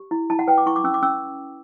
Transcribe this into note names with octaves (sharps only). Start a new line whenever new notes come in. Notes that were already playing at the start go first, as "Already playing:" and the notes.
Already playing: G4
E4
E4 A5
F#5
B4 G5
D6
E4 C#6
D6
C#4 E6
D6
C#4 E6